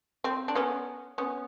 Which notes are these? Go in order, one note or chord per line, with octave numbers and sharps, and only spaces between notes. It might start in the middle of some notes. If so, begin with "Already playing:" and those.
C4
D4
B3 C#4
B3 C#4